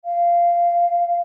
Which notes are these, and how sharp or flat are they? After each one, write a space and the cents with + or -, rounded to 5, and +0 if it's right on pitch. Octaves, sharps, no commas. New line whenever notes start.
F5 -15